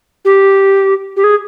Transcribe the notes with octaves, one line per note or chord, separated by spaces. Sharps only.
G4
G4
G#4